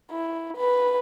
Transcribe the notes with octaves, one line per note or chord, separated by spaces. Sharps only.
E4
B4